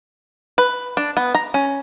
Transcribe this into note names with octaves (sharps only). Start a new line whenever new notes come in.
B4
D4
B3
A#5
C#4